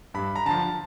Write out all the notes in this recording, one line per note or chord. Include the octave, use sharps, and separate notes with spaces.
G2 B5
A#5
D3 F3 A5